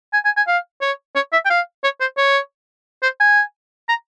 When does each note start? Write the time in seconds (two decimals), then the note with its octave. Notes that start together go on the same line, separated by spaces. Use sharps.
0.13 G#5
0.25 G#5
0.37 G#5
0.47 F5
0.81 C#5
1.15 C#5
1.33 E5
1.45 G5
1.50 F5
1.84 C#5
2.01 C5
2.18 C#5
3.03 C5
3.20 G#5
3.89 A#5